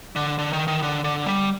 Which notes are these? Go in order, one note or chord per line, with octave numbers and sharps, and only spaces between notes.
D3
D3
D#3
D#3
D3
D3
G3